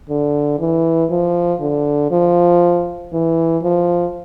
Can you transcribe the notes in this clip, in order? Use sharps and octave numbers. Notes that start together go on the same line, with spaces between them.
D3
E3
F3
D3
F3
E3
F3